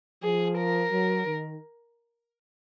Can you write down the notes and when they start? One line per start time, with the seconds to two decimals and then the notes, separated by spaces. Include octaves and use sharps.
0.23 F3 G#4
0.58 A#4
0.91 F#3
1.26 D#3